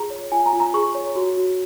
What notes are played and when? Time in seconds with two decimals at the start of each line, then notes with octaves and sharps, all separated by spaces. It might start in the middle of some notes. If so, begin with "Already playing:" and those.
Already playing: F4 G#4 A#5
0.10 C#5
0.32 F4 G#5
0.46 A#5
0.53 F4
0.60 A#5
0.74 G#4 C#6
0.95 C#5
1.16 F#4
1.37 F#4